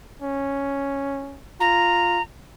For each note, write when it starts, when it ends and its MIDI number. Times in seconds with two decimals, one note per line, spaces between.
0.22 1.43 61
1.60 2.19 65
1.60 2.22 82